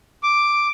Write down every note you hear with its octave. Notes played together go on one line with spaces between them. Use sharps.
D6